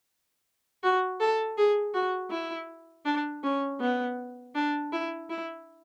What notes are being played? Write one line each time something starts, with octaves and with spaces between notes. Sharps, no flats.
F#4
A4
G#4
F#4
E4
D4
C#4
B3
D4
E4
E4